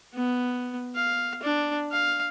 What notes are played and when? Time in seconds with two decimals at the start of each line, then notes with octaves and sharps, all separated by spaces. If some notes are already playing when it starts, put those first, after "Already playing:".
0.14 B3
0.96 F5
1.43 D4
1.92 F5